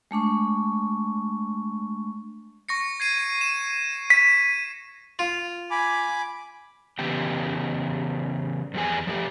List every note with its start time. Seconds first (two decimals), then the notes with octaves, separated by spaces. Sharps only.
0.11 G#3 A3 D4 C#6
2.69 C#6 A#6 C#7
3.00 G#6 C7 D#7
3.41 E7
4.10 B6 D#7
5.19 F4
5.71 G#5 B5 D6
6.99 C#3 E3 B3 G4 G5
8.74 E2 F3 G3 G#4 G#5
9.07 F3 A3 G4